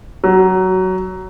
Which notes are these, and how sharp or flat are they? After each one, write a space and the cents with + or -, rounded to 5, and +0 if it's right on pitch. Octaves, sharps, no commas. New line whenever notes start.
F#3 +15